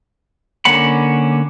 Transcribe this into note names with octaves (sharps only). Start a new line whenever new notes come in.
D3 A#3 C#4 F#5 B5